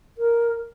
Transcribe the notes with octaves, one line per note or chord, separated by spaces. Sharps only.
A#4